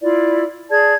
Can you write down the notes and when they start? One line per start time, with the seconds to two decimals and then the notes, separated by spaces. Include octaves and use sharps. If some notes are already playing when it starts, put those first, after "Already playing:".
0.02 E4 F4 D5
0.71 G#4 D5 A5 G#6